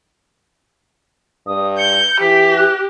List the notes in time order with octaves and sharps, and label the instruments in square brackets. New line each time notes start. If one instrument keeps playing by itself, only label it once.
[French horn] G2 [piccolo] D#6
[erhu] G6 [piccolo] C#7
[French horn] E3 [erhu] G4 [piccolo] B6
[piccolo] F#6